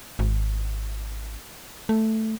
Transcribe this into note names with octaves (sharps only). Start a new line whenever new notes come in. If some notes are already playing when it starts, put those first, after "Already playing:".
G#1
A3